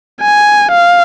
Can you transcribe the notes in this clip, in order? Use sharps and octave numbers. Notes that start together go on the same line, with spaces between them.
G#5
F5